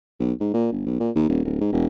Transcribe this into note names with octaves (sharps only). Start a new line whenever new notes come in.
B1
G#2
A#2
G1
B1
A#2
D#2
D#1
D1
G#2
E1